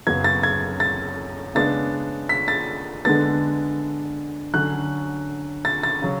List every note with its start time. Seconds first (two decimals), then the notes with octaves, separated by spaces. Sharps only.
0.07 F#2 C#3 F#3 B3 G#6
0.24 A6
0.43 G#6
0.80 A6
1.55 C#3 G#3 B3 D4 A6
2.29 B6
2.48 A6
3.05 D3 G#3 B3 D4 A6
4.54 D3 F#3 C#4 F#6
5.65 A6
5.83 A6
6.02 C#3 F#3